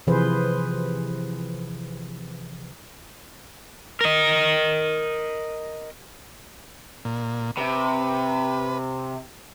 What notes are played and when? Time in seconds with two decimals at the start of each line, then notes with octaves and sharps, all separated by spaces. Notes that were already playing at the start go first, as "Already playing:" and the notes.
0.07 C3 E3 F3 G#4 B4 C5
4.01 A#4 D#5
7.05 A#2
7.57 C3 B4